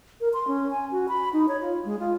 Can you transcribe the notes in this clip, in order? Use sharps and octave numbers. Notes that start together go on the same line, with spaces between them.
A#4
C6
C#4
G#5
F#4
B5
D#4
C#5
F4
G#3
F4